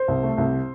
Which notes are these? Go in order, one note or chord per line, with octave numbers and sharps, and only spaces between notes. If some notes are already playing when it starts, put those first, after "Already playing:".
Already playing: C5
C2
A3
C2